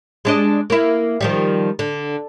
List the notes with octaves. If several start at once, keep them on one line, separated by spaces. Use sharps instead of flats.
G#3 D4 D#5
A#3 E4
D#3 F3 G3
D3